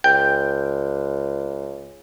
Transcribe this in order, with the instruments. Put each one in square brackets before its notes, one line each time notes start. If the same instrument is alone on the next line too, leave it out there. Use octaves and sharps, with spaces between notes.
[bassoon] C#2 [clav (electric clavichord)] G5